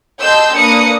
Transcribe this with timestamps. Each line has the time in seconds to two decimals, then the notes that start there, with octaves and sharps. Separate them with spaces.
0.22 G4 D#5 A5 C6 E6 G6
0.56 A#3 D4 B4 A#5 D#6 C#7